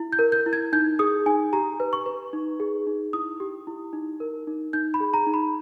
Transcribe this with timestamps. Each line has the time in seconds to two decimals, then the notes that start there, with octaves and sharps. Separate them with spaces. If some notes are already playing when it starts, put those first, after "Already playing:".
Already playing: E4
0.13 G6
0.19 A#4
0.32 G6
0.46 E4
0.53 G#6
0.73 D#4 G6
0.99 G#4 D#6
1.26 D#4 G#5
1.53 G4 A#5
1.80 B4
1.93 C#6
2.06 B4
2.33 D#4
2.60 G#4
2.87 D#4
3.13 E4 D#6
3.40 G4
3.67 E4
3.93 D#4
4.20 A#4
4.47 D#4
4.73 D#4 G6
4.94 B5
5.00 G#4
5.14 A#5
5.27 D#4
5.34 B5